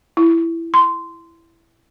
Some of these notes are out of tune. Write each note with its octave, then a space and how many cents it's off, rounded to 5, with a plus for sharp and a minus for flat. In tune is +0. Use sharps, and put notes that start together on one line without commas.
E4 +10
C6 -15